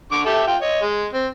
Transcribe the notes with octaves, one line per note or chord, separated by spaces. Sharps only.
D3 C#6 D6
G4 A4 E5
F4 G5
C#5 D#5
G#3
C4